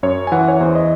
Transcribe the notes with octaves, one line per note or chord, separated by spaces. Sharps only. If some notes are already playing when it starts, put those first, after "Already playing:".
F#2 C#5
G#5
E3 F#5
C#5
E2 C5
D#5